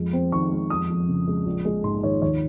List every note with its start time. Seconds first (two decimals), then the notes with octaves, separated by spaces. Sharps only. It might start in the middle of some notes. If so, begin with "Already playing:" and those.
Already playing: F2 G#3
0.13 C4
0.32 D#3 C#6
0.51 G#3
0.70 F2 D#6
0.89 F2
1.08 C#3
1.28 G#3
1.46 A#1
1.65 G#3
1.83 G#2 C6
2.03 D#3 C#5
2.22 D#2 C#5